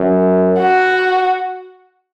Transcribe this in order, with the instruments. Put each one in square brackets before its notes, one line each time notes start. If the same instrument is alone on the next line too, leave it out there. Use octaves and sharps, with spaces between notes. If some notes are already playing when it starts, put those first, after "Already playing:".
Already playing: [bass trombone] F#2
[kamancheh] F#4